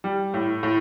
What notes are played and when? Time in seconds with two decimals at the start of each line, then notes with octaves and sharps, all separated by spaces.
0.04 G3
0.34 A2
0.63 A2